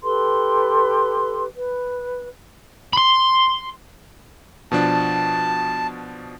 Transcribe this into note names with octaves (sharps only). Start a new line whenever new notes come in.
G4 A4 B4 C6
B4
B5 C6
B2 F3 D4 A5